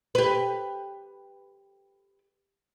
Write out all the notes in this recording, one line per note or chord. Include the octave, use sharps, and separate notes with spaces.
G4 B4